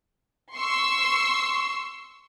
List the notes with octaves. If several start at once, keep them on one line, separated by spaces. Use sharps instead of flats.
C6 C#6 E6